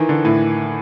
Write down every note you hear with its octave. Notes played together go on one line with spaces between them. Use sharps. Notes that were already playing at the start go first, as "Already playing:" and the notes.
Already playing: D#3 E3
D3
A2